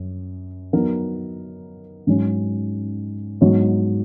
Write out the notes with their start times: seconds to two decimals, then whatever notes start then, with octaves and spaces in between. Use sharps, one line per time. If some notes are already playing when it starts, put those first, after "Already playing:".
Already playing: F#2
0.73 F#3 B3 D#4 A#4
2.07 G#2 F#3 C#4
3.41 G#2 F#3 B3 F#4 C#5